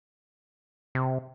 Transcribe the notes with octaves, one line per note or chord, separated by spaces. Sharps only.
C3